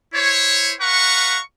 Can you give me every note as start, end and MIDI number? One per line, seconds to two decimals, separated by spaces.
0.14 0.74 64
0.14 0.74 72
0.14 0.74 73
0.82 1.39 71
0.82 1.39 77
0.82 1.39 78
0.82 1.39 82
0.82 1.39 85